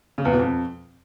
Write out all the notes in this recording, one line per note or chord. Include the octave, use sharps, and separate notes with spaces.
C#3
E2
B2
F2